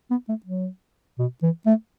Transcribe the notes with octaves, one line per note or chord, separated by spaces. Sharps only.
B3
A3
F#3
B2
E3
A3